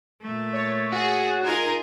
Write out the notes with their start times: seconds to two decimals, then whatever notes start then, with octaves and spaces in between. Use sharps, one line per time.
0.22 A#2 A3
0.53 C#5 A6
0.92 F#4 G#4
1.44 D#4 F4 G#4 A#4 G#6